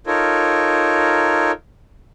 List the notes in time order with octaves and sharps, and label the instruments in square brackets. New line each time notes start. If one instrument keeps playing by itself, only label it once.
[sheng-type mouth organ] D#4 F4 A4 A#4 C#5